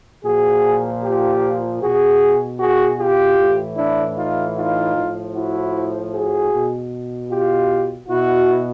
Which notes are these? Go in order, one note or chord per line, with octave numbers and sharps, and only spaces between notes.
A#2 F3 F#4 G#4
F4 G4
B2 F#4 G#4
F#4 G#4
F4 G4
A2 E3
D4 E4
D#4 F4
D#4 F4
A2 F3
E4 F#4
F#4 G#4
B2
F4 G4
B2 E4 F#4